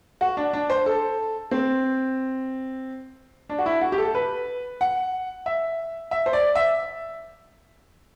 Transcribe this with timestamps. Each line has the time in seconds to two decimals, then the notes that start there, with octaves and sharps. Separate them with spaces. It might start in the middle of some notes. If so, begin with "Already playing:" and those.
0.21 F#4
0.37 D4
0.53 D4
0.70 C5
0.86 A4
1.51 C4
3.50 D4
3.59 F#4
3.66 E4
3.81 F#4
3.92 G4
3.98 A4
4.15 B4
4.81 F#5
5.46 E5
6.11 E5
6.26 C5
6.33 D5
6.55 E5